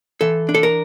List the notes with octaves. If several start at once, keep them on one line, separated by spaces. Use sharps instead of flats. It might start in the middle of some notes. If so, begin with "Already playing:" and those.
E3 A4
D4
A4
A#4